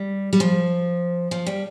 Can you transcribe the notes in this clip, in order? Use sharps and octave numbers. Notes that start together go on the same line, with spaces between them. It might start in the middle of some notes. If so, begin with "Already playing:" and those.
Already playing: G3
G3
F3
F3
G3